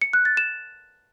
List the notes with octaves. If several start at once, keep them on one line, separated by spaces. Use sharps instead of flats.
C#7
F#6
A6
E7